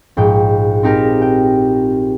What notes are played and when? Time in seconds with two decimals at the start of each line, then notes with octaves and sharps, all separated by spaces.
0.17 A#1 G#2 G5
0.83 C4 D#4 G4 A#4
1.22 G5